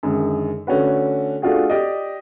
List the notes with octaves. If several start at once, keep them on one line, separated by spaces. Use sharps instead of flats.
F#2 D3 D#3 G#3
D3 A3 C#4 D4 F#4 B4
A3 D4 F4 F#4 G#4
G4 D5 D#5